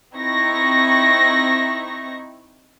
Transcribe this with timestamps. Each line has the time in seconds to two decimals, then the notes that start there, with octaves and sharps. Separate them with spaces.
0.14 C4 D#4 E4 C#6 A#6